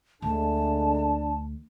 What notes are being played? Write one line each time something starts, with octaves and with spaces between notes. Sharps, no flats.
D2 D3 G#3 A3 D4 A5